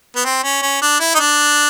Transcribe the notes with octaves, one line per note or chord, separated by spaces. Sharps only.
B3
C4
C#4
C#4
D4
E4
D#4
D4